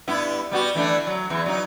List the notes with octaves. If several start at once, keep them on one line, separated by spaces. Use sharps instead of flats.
G2 B3 E4
G3 B3 F#4
E3 A3 D4
F#3
E2 E3
F#3 D#4